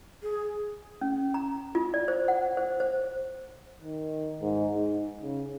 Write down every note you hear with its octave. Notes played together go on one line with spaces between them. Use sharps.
G#4
C#4
A#5
F4
D5
C5
F#5
C5
C5
D#3
G#2
D#4
C#3